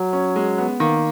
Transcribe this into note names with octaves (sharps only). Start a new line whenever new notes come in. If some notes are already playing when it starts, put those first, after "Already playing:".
Already playing: F#3
C#4
G#3
B3
D#3 A#3